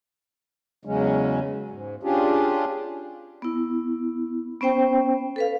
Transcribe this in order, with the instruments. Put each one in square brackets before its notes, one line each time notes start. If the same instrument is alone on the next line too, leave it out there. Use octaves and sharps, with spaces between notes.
[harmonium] E2 C#3 F#3 G#3 C#4
G#2
C#4 D4 F4 G4 G#4
[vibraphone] B3 E4
B3 C#4 C5 G5
A4 B4 F5